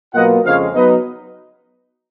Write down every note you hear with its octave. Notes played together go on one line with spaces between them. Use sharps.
B2 F#3 A#3 F4 D#5 F#5
F2 C#3 F3 G#3 C#5 F5
F#3 B3 D#4 B4 D#5